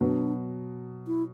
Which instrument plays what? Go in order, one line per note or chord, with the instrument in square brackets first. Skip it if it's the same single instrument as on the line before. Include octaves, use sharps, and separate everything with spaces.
[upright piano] B2 F#3 B3 [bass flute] D4
[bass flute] E4